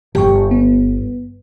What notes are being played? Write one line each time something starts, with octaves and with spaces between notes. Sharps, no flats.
G1 G4 G5 C#6
B3